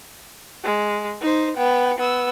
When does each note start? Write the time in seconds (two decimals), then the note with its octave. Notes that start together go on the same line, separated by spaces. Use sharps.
0.64 G#3
1.21 D#4 C5
1.56 B3 G5
1.99 B3 E6